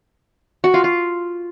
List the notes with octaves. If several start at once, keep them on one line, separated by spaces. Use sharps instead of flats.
F#4
F4
F4